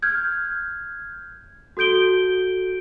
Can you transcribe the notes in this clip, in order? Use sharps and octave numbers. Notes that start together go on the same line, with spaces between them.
F6 G6 G#6
F#4 A4 G6 D7 G7